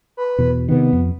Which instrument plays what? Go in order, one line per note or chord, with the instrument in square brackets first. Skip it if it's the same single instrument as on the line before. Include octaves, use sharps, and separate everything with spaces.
[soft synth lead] B4
[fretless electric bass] E2 B2
[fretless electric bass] C3 D#3 [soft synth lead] B3
[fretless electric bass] F2